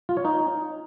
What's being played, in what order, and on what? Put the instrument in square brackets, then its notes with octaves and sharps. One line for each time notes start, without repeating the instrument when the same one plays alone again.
[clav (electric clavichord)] F4
C#5
D#4